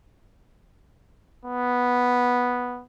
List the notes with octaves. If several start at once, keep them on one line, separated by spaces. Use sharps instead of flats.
B3